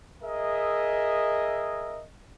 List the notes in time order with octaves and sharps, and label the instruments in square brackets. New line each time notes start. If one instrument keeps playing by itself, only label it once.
[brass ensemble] G#4 A#4 D#5 E5